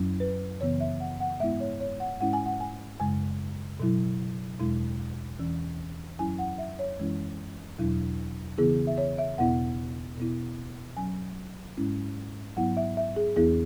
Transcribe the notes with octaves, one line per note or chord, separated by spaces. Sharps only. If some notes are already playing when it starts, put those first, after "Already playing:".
Already playing: F#2 F#3 C#4 E4
B4
F#2 C#3 E3 B3 C#5
E5
F#5
F#5
G#2 G#3 B3 E4 E5
C#5
C#5
F#5
G#2 G#3 C#4 E4 F#5
G#5
F#5
G#5
F#2 C#3 G#3 G#5
B2 F#3 E4
E2 B2 G#3 E4
E2 E3 C#4
F#2 F#3 C#4 E4 G#5
F#5
E5
C#5
F#2 E3 G#3 C#4 E4
E2 B2 F#3 E4
C#3 E3 B3 E4 G#4
E5
C#5
E5
E2 B2 B3 E4 F#5
B2 B3 E4
F#2 F#3 C#4 G#5
G#2 G#3 C#4 E4
G#2 F#3 B3 E4 F#5
E5
E5
G#4
E2 E3 B3 E4 G#4